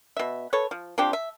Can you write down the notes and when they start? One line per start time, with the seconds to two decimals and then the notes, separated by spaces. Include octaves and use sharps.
0.17 B2 E5
0.53 A4 B4 C#5
0.71 F3
0.98 F3 C4 D4 G4
1.13 E5